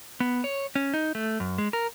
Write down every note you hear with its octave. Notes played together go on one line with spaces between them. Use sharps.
B3
C#5
C#4
D#4
A3
F#2
G#3
A#4